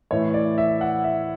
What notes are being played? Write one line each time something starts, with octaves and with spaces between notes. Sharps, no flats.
A2 E3 C#5
D5
E5
F#5
E5